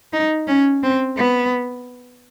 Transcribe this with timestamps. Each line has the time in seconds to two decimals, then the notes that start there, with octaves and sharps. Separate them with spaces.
0.13 D#4
0.47 C#4
0.83 C4
1.18 B3